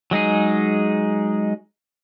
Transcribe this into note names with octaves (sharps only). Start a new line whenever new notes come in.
F#3 G#3 D#4 G#4